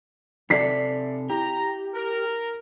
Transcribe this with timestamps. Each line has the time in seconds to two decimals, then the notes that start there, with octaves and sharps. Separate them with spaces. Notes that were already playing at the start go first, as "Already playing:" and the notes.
0.50 C3 A4 D5 E5 B6 C7
1.29 E4 G4 A#5
1.94 A#4